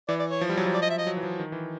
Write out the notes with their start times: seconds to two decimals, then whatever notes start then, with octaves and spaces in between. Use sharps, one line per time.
0.08 E3 D5
0.19 D5
0.30 C#5
0.41 F3
0.49 G3
0.57 F#3
0.66 F3
0.74 D5
0.82 D#5
0.90 E5
0.98 D#5
1.07 F#3
1.17 E3
1.23 F3
1.39 D#3
1.52 E3